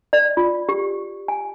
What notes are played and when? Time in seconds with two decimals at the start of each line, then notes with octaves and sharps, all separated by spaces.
0.13 D5
0.37 F4
0.69 G4
1.28 G#5